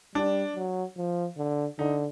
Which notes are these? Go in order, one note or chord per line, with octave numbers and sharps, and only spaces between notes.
G3 D4
F#3
F3
D3
D3 D#4